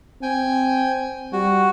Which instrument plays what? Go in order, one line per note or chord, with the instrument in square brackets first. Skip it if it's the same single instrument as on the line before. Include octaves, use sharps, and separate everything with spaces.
[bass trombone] C4 [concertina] G5 G#5
[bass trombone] G3 [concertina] F#4